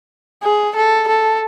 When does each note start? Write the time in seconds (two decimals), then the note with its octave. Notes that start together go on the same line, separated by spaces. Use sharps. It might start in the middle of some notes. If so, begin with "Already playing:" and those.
0.43 G#4
0.75 A4
1.08 A4